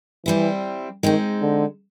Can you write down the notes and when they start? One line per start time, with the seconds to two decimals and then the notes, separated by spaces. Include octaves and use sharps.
0.26 E3 G3 C4 E4
1.03 D#3 G#3 C4 D#4
1.42 D3